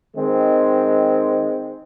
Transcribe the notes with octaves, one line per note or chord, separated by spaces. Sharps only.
D#3 G#3 C4